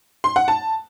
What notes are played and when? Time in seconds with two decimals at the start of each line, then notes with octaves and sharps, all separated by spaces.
0.24 C6
0.36 F#5
0.48 A5